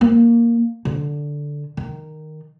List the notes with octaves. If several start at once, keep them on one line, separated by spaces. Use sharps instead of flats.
A#3
D3
D#3